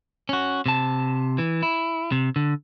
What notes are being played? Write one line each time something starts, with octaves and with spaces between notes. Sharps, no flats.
C#4 F#4
C3 A5
E3
E4
C3
D3